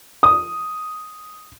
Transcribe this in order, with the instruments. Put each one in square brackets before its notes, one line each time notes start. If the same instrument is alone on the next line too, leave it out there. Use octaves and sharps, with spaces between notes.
[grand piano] D#6